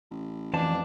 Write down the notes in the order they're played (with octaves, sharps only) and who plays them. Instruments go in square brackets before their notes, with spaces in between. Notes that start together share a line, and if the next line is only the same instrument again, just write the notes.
[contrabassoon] A1
[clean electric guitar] F2 A5 [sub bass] E3 [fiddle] D4